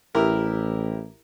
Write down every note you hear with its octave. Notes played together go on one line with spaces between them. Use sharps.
A1 E4 G4 A#4